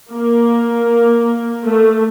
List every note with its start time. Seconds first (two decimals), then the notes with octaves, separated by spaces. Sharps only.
0.11 A#3
1.63 A3